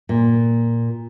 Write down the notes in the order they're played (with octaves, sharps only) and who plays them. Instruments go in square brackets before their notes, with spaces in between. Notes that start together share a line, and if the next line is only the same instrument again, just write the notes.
[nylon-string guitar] A#2